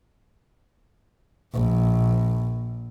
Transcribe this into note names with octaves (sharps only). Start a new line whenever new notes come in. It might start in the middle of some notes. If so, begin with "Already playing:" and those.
A#1